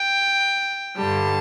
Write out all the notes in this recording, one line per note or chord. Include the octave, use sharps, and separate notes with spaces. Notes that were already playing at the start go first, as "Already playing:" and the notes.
Already playing: G5
G2 D3 G3 A5